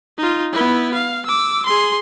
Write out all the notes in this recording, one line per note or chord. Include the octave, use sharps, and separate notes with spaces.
D#4 F4
B3 E4
F5
D6 E6
G#4 C6